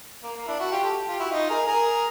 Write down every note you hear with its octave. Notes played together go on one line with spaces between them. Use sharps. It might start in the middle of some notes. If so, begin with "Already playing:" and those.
A#3
A#3
D4 E4
E4 F#4
F4 G4
G4 A4
F4 G4
E4 F#4
D#4 F4
G#4 A#4
G#4 A#4